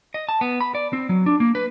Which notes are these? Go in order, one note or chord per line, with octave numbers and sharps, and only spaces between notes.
D#5
A5
B3
B5
D5
C4
F#3
D4
A#3
B4